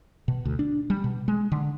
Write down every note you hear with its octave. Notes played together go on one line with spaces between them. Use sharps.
B2
D2
D4
G3
B2
G#3
D3